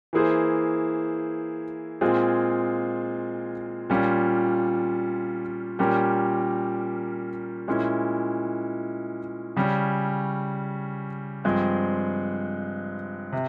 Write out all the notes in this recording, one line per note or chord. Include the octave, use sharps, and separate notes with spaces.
E3 A#3 E4 G#4 C5
A#2 G#3 C4 F4 G#4
A#2 G3 C#4 F4
A#2 G3 C#4 G4 A#4
A#2 G#3 C#4 E4
C#3 G3 C#4
G2 F3 G#3 C4
C3